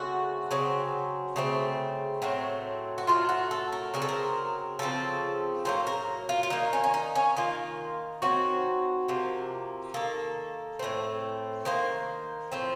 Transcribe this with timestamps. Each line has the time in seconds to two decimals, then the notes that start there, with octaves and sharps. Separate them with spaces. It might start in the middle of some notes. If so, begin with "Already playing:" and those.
Already playing: C#3 A3 C4 F#4
0.51 C#3 F#3 C4
1.36 C#3 A3 C4
2.22 A2 F#3 A3 C4
2.98 F#4
3.07 A2 F#3 A3 F4
3.29 F#4
3.51 A4
3.72 A#4
3.94 C#3 F#3 C4 A#4
4.02 A4
4.09 A#4
4.79 C#3 F3 C4 A4
5.65 A2 F#3 A#3 C5
5.87 A#4
6.29 F4
6.43 F4
6.50 D#3 A#3 D#4
6.73 C#4
6.84 C#4
6.94 D#4
7.15 C#4
7.37 D#3 A#3 F4
8.22 D#3 F#3 C4 F#4
9.08 C3 F3 A#3
9.94 D#3 A#3 A4
10.79 A2 A3 C4
11.65 D#3 A#3 C5
12.52 A2 F3 C4